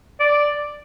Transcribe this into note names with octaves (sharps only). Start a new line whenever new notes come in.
D5